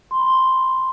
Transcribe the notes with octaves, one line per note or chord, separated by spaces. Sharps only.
C6
B5
C6